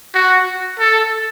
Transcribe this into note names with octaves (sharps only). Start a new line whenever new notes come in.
F#4
A4